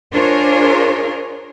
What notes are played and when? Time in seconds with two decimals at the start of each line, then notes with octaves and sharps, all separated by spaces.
0.13 D4 F4 G#4 A#4 C5 C#5